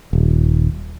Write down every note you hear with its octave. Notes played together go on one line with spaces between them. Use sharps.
D#1